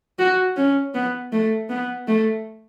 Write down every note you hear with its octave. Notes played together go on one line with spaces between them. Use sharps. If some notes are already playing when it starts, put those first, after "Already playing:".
F#4
C#4
B3
A3
B3
A3